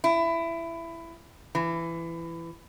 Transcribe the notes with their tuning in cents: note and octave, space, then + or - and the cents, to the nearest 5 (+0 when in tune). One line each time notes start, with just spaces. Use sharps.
E4 +15
E3 +20